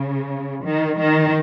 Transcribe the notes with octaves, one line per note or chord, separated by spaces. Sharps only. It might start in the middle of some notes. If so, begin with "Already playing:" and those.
Already playing: C#3
D#3
D#3